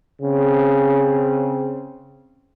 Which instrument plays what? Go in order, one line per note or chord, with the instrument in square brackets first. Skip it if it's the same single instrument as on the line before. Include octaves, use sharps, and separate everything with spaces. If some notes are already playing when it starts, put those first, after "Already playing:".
[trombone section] C#3 C4